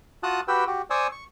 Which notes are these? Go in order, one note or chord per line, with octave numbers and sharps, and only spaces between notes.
F4 F#4 A5 D#6 F#6
F#4 G4 B4 G5 E6
F#4 G4
C5 D5 G#5 C#6 D#6 E6
C#6